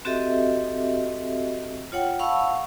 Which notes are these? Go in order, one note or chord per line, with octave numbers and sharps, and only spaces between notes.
C4 F#4 G4 A4 D#5 E5
F4 C#5 F#5 G5
F5 F#5 A5 B5 C#6 E6